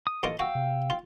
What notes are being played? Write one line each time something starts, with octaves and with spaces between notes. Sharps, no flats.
D#6
A1 F4 A4 D#5 D6
F#4 F5 G5 E6
C3
F4